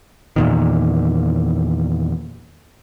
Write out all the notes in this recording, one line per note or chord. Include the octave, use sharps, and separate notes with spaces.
E2 A#2 D#3